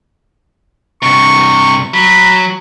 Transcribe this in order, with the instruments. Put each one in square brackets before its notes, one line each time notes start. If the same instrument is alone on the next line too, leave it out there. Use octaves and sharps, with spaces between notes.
[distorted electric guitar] G2 C3 [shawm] C#6
[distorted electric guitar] F#3 [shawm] B5